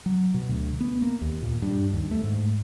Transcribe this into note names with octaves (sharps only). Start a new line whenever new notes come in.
F#3
B2
D2
B3
A#3
D#2
A#2
G2
D#2
A3
G#2